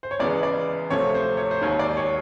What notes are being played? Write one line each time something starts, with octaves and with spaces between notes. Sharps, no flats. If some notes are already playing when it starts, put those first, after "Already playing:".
C5
C#5
C#2 C#3 E3 G#3 B3 D5
D5
D2 C3 F3 A3 C#5
C5
C#5
C5
E1 D#2 D#3 C#5
D5
C#5